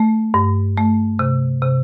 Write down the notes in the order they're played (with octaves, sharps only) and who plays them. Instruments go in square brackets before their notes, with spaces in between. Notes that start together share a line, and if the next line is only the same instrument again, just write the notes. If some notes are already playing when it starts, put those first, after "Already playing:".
Already playing: [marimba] A3
G2
A3
C3
C3